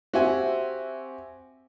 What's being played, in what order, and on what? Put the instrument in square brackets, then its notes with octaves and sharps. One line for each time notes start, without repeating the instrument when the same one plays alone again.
[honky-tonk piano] C4 E5 [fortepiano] F#4 G4 G#5